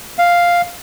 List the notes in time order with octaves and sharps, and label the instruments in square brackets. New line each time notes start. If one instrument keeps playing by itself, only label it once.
[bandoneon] F5